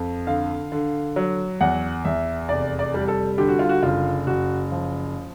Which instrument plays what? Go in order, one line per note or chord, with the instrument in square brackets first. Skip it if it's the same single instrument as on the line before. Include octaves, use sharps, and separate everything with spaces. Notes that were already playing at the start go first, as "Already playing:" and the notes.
Already playing: [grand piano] F2
D3 F5
D3
F#3
E2 F#5
E2 E5
F1 D5
D5
G3
A4
D3 G4
F#4
F4
F#4
F#1 F4
F#1 F#4
F3